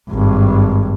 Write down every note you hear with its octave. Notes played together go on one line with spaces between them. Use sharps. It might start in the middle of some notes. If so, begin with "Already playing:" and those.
G#1 G2